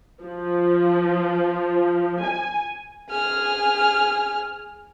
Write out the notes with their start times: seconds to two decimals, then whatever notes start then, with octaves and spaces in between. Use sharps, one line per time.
0.22 F3
2.23 G#5
3.10 G#4 F6